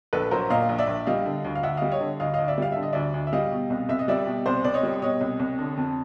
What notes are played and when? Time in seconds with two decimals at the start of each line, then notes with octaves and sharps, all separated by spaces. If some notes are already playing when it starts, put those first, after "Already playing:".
0.13 A#1 A4 B4
0.31 F#3 A#4 C5
0.50 A#2 D#5 F5
0.69 A#1
0.78 D5 E5
0.88 A#1
1.06 G3 D#5 F5
1.26 D3
1.44 D2
1.55 F5
1.63 D2 E5 F#5
1.77 G3 D#5 F5
1.92 C#5 D#5
2.01 D3
2.20 D2 D#5 F5
2.34 D2 D#5 F5
2.48 D5 E5
2.58 G3 F5
2.72 D3 E5
2.83 D#5
2.93 D2 D5 E5
3.14 D2
3.27 E5
3.33 G3 D#5 F5
3.52 B2
3.70 C2
3.89 C2 E5
3.99 D#5
4.08 G3 D5 E5
4.27 B2
4.46 C2 C5 D5
4.64 C2 D5
4.74 C#5 D#5
4.83 G3
5.02 B2 C#5 D#5
5.21 C2
5.40 C2
5.58 D3
5.77 F2